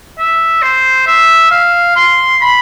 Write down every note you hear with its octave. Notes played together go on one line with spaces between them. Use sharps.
E5
C5
E5
F5
C6
B5